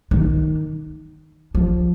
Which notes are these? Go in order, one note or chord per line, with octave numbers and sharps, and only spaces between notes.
D#3
F3